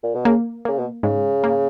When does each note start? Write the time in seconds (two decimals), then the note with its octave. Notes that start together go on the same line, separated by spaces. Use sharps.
0.04 A#2
0.15 B2
0.25 C#3 A#3
0.65 C#3 A#3
0.78 B2
1.03 G#2 C#3
1.44 A#3